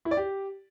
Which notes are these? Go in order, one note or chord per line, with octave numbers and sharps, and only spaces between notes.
E4
D5
G4